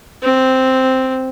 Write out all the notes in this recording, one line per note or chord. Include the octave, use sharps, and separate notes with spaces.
C4